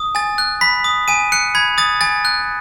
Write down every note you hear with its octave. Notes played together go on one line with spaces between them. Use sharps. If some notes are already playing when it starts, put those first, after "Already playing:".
Already playing: D#6
G#5 A6
F#6
B5 B6
D#6
G#5 D#7
F#6 C#7
B5 G#6
D#6 A6
G#5 A6
F#6